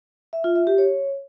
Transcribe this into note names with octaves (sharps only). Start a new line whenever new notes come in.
E5
F4
E5
G4
C#5